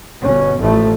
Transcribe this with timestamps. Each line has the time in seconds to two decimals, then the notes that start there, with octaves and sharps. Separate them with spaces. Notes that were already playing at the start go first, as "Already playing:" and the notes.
0.20 G1 B2 C#4
0.58 A1 A2 F3 A3